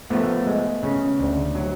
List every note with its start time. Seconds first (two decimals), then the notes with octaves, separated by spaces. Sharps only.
0.10 F3 A3 B3
0.46 G#3
0.83 C#3
1.19 D2
1.55 F#3